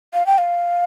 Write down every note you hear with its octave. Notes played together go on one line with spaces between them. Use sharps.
F5
G5
F5